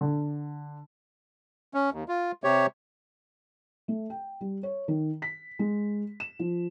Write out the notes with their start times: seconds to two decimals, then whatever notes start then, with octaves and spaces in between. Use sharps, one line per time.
0.01 D3
1.74 C#4
1.93 D#2
2.08 F4
2.44 C3 G4 C#5
3.88 A3
4.10 G5
4.41 G3
4.63 C#5
4.88 D#3
5.22 B6
5.59 G#3
6.20 E7
6.39 F3